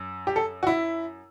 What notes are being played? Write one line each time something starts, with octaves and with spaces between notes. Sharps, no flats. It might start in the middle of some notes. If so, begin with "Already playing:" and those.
Already playing: F#2
G4
A4
F#4
E4